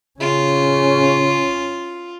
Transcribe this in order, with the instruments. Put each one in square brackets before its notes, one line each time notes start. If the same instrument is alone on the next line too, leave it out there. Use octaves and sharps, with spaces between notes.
[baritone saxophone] C#3 [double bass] C#4 [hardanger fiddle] F4